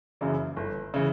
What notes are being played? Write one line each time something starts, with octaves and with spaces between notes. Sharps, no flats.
F#2 C#3 E3
G1
C#3 E3